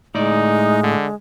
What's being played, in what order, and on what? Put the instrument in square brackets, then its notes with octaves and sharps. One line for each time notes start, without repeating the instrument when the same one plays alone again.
[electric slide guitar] A2 D5 [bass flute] G#3 [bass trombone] D#4
[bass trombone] D3